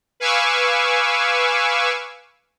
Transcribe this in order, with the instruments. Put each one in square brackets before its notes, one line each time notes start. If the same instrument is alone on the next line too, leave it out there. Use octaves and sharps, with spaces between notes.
[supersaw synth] B4 F5 G#5 C#6 D6 E6